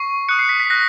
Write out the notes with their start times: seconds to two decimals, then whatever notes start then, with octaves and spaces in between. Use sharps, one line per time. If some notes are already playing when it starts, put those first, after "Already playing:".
Already playing: C#6 C7
0.28 D#6 F#6 C#7
0.39 C7
0.49 B6
0.60 B6
0.70 F#6 A#6